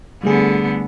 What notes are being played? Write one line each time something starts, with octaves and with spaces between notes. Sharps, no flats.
D3 G3 A3 B3 G#4